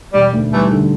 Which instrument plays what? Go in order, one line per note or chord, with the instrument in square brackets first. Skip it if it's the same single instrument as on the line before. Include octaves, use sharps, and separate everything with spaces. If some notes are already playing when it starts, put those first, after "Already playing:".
[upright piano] E1 [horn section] G3
[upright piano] D2
[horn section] E3 A3 [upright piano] G3
[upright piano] D3